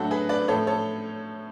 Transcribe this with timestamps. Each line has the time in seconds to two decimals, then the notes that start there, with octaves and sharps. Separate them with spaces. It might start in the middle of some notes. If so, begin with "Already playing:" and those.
Already playing: A2 F#3 D4 F#4 A4
0.11 G#4 B4
0.29 B4 D5
0.48 A2 F3 A4 C#5
0.67 A4 C#5